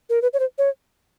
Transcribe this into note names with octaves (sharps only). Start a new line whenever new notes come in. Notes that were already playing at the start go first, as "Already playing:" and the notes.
A#4
B4
C#5
C5
C#5